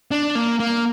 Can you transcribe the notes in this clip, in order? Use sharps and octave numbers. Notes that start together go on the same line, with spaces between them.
D4
A#3
A#3